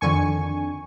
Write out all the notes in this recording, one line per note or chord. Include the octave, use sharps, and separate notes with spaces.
F2 D3 D#3 G#5 C#6